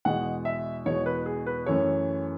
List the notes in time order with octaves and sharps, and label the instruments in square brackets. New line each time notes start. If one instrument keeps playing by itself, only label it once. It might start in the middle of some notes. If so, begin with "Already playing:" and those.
[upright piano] E2 B2 G#3 F#5
E5
E2 B2 G#3 C#5
B4
G#4
B4
F#2 E3 A3 C#4 C#5